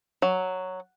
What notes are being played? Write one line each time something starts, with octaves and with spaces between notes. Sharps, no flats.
F#3